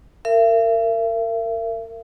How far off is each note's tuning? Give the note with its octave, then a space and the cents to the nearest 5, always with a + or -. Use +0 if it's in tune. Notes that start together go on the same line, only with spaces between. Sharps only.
A#4 -30 E5 +40